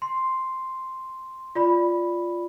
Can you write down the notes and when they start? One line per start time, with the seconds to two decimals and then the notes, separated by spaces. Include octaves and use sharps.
0.02 C6
1.55 F4 D5 B5